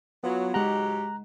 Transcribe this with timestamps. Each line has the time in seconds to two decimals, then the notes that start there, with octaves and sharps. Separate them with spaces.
0.24 F#3 B3 F4 B4
0.54 G#2 F#3 G#3 G4 F#5 A#5 F#6